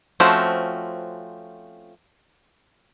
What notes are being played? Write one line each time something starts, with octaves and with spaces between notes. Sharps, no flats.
F3 A3 C4 C#4 F#4